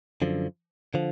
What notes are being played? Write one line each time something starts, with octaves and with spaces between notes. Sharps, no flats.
F#2 D3 F3
D3 F3